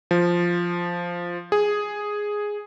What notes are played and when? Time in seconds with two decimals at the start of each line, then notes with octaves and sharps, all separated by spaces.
0.11 F3
1.52 G#4